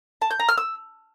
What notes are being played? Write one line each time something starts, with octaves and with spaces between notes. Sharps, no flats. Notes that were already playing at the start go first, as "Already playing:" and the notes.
A5
G6
A#5
F6
E6